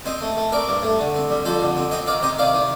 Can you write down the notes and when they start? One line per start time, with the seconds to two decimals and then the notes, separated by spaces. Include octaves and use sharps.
0.06 C4 C5 D#5
0.22 A3
0.37 A3
0.52 C4 A#4 D5
0.68 G2
0.83 A3
0.99 D3
1.15 C4
1.30 G3
1.45 F2 A4 C5
1.61 D3
1.77 C4
1.91 C4 C5 D#5
2.07 D#3 D5 F5
2.23 C3 C5 D#5
2.38 D#3 D5 F5
2.54 D#3